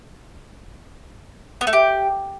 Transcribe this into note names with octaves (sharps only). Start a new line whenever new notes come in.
B3
A3
G4